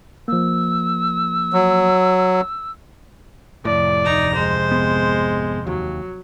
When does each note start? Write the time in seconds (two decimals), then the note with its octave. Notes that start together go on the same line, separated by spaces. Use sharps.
0.28 F3 A#3 E6
1.53 F#3
3.65 F2 A2 C3 D5
4.05 D1 D#4 A#5
4.36 G#3 C5
4.71 G#1 B3
5.67 D#2 F#3